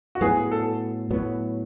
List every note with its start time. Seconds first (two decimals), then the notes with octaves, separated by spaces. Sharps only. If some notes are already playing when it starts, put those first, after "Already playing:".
0.15 F#4
0.21 A2 F#3 B3 G#4
0.51 A4
1.11 A2 F#3 B3